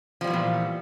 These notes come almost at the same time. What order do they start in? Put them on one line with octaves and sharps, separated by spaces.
F3 G3 E3 B3 A#2